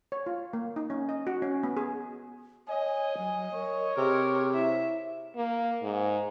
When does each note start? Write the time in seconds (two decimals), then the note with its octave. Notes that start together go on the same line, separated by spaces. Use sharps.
0.12 C#5
0.26 F4
0.53 A#3
0.76 D#4
0.90 C#4
1.09 D#5
1.27 F#4
1.42 C#4
1.63 B3
1.77 G#4
2.68 C#5 D#5 G#5
3.18 F#3
3.54 A#4 C#5
3.97 C3 G#4 A#4
4.54 E4 E5
5.37 A#3
5.82 G#2